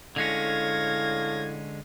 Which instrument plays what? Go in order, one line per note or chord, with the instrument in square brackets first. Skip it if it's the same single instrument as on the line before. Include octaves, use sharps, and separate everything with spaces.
[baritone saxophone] A2 [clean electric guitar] D3 G#3 C#4 [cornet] F5 [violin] G#6 A#6